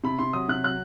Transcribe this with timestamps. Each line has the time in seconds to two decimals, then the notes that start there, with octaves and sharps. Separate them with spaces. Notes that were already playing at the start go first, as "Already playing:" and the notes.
0.04 C3 B5
0.19 C3 C6
0.33 F#3 D#6
0.49 C3 F#6
0.64 F#3 F#6